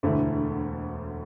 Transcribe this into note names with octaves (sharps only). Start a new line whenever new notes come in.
E1 D2 D3 A3 E4